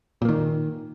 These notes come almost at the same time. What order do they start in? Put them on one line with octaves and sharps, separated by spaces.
A#2 A#3 D#3